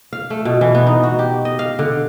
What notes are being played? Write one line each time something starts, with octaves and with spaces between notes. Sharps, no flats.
F5
A3
B2
E3
B3
D#4
F#4
G4
D#5
F5
D3